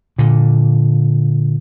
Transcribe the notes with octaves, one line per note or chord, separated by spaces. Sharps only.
A#2 D3